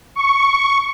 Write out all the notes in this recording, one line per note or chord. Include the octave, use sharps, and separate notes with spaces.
C#6